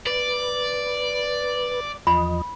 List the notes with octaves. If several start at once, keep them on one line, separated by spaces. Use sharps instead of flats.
B4 D5
E2 F3 D#5 B5